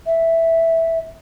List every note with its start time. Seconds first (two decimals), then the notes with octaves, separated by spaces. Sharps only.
0.06 E5